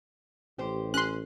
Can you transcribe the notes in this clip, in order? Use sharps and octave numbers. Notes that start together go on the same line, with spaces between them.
A1 G4 C5
C#4 C6 F#6